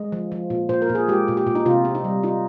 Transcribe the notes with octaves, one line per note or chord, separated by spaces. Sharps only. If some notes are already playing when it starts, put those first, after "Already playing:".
Already playing: G#3 D#5
F3
F3
A#2
A#2 C5
A#4
A#2
G#4
G#3 G4
A#2
G4
A#2
D#4
C3 F4
C4
D#4
G3
D#4 F4